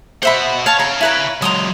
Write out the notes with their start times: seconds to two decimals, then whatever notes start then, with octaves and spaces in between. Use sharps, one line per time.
0.23 B2 C5 E5 F#5 B5
0.66 C#5 F5 A5 C#6
0.80 C#5 F5 A#5
1.01 E4 B4 A#5
1.42 F#3 G#3 A#5 C6 D#6